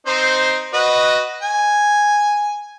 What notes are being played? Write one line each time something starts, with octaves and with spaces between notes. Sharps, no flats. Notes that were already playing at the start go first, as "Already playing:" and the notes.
C4 D#4 C5
F#4 B4 D#5
G#5